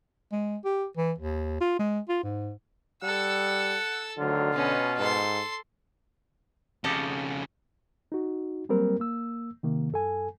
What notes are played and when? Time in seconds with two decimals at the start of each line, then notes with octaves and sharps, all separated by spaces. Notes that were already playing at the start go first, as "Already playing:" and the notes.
0.32 G#3
0.65 G4
0.97 E3
1.18 D#2
1.61 F4
1.79 G#3
2.09 F4
2.23 G#2
3.03 G3 A4 F#5 E6
4.18 D2 D3 D#3 F#3 F4
4.53 B2 B3 C#4
4.99 G#2 A4 C6
6.84 F2 C#3 G4 A4 D#5
8.12 D#4 F#4
8.69 F#3 G3 A#3 C4 A#4
9.00 A#3 E6
9.63 C3 D#3 A#3
9.92 F#2 A4 G#5